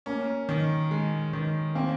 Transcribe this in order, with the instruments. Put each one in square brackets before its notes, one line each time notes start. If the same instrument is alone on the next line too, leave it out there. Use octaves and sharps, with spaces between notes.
[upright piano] A#3 [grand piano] C#4
[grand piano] D#3
G#3
D#3
[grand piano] A#3 [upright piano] C4